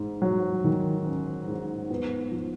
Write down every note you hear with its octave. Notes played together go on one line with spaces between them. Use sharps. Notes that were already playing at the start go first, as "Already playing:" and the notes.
Already playing: G#2
F#3
D#3
C#4
G#2
B3
F3